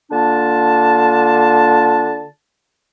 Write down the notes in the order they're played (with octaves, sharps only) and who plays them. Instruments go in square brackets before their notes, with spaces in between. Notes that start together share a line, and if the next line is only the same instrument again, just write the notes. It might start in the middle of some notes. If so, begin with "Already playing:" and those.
[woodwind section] D3 A#3 D4 F4 A5